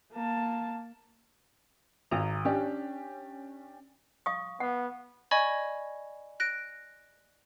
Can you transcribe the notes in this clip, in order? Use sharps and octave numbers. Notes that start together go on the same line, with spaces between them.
A#3 A5
G#1 A#5
C#4 D4 G4
F5 C#6 D#6
B3 F#5
D5 D#5 G#5 B5 C#6 G#6
F#6 A#6 D7